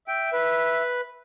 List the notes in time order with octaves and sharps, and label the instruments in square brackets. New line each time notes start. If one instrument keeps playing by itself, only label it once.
[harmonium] E5 [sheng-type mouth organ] G5
[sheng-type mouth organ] B4